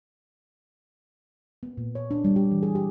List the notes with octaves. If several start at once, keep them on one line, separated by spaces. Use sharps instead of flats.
B3
A#2
C#5
D4
G3
G4
E3
G#4
G4